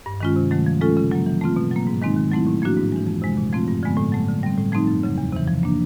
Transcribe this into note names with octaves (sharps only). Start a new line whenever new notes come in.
G2
D#3 G#3 C#4 F4
C3
D#3 F#3 A3
F3
G#3 C#4 F4 A4
C#3
F#3 A#3
E3
A3 C4 F4
B2
F#3 A#3
G#2
D#3 G#3 C4 D#4
D#3
F#3 A3 C4 E4
A2
F3 A#3 D4 F#4
G#2
E3 G#3
F2
C3 F3 G#3
A#2
F3 A3 C4 F4
G2
D3 F3 G#3 B3
A2
F#3 A3
D3
G3 C4
A2
F3 A3 C4 D#4
F#2
C#3 F#3
E2
C3 E3
F3
A#3 D4